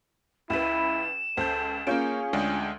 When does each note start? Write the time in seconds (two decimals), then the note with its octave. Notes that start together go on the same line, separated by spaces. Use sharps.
0.50 C#2 E4 B4 E7
1.37 C#2 A4 C5 G6
1.87 A#3 C#4 F4 G#4 G6 D7
2.33 D2 G#3 D4 G5